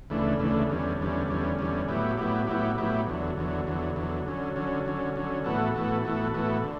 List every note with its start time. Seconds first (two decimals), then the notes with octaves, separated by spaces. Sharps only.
0.10 D2 C#3 E3 A3 D4
0.39 D2 C#3 E3 A3 D4
0.70 E2 D3 G3 C#4
1.00 E2 D3 G3 C#4
1.28 E2 D3 G3 C#4
1.59 E2 D3 G3 C#4
1.88 A2 F#3 B3 E4 G4
2.18 A2 F#3 B3 E4 G4
2.47 A2 F#3 B3 E4 G4
2.78 A2 F#3 B3 E4 G4
3.07 E2 D3 F#3
3.38 E2 D3 F#3
3.67 E2 D3 F#3
3.96 E2 D3 F#3
4.26 D3 F#3 C#4
4.56 D3 F#3 C#4
4.86 D3 F#3 C#4
5.16 D3 F#3 C#4
5.44 A2 E3 B3 F#4 A4
5.74 A2 E3 B3 F#4 A4
6.04 A2 E3 B3 F#4 A4
6.34 A2 E3 B3 F#4 A4
6.63 D3